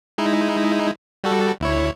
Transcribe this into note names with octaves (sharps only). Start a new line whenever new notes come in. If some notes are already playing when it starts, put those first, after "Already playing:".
G#3 D#4 E4
G3 F#4 A4
D2 E4 C#5